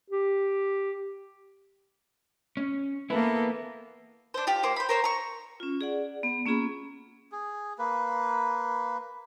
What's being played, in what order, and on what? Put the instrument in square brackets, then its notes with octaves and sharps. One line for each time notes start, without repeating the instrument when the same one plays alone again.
[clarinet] G4
[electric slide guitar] C#4
[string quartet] A#3 B3 A4 [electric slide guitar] E4 B4
[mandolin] D4 C5
F4 G4
A#3 C5 D6
C5 B5
A#4 C5 C#5
A#5 C#6
[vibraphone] C#4 F4
G#4 D5 F#5
B3
A#3 C#4 F4 G#4 B5
[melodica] G#4
A#3 B4